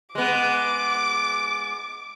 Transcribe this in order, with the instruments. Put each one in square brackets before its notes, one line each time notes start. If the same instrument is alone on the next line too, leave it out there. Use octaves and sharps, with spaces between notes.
[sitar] G#3 B3 [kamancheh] D6